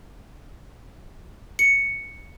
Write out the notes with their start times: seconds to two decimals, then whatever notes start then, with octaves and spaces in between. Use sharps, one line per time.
1.59 C#7